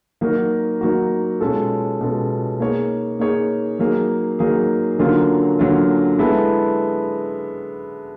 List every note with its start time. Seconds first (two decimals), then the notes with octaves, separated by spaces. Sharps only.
0.21 F#3 A#3 D#4 F#4 A#4
0.81 F#3 A#3 D#4 F#4 A#4
1.41 B2 G#3 C#4 F4 A4
2.01 B2 G#3 C#4 F4 A4
2.60 A#3 D#4 G#4 C#5
3.19 A#3 D#4 G#4 C#5
3.79 F#3 A#3 D#4 G#4
4.39 F#3 A#3 D#4 G#4
4.99 D3 F#3 A#3 C#4 F4
5.59 D3 F#3 A#3 C#4 F4
6.18 G#3 B3 E4 A4